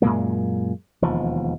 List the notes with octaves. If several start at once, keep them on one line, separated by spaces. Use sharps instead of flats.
F#2 A#2 G#3 A#3
E1 D#2 F3